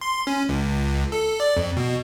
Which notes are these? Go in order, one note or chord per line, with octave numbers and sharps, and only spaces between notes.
C6
C#4
C#2
A4
D5
F2
B2